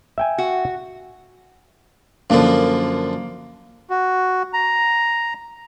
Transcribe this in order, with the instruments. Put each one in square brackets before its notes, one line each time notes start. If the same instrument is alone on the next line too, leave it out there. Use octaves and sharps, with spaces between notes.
[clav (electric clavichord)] E5 G5 G#5
[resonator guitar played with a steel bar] F#4
[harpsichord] F#2 D3 F3 [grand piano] A#3
[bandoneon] F#4
A#5